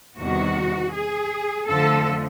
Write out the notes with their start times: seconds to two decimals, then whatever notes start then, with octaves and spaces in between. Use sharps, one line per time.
0.18 E2 C3 D#3 G3 F#4
0.93 G#4
1.66 F2 D3 F3 A3 A4